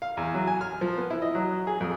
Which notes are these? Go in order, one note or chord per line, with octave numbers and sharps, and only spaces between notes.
F5
E2
F#3
G#5
F6
F3
B3
E4
D#5
F#3
G#4
F2